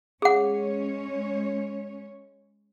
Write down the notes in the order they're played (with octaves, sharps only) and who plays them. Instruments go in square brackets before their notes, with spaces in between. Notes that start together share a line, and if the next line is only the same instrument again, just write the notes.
[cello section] G#3 C#4 C#5 [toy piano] G#4 F#5